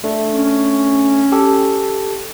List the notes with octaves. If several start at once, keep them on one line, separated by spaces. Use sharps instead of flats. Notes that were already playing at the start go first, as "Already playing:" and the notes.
A3 D4
C#4
G4 A4